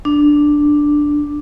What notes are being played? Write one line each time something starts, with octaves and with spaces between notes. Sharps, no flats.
D4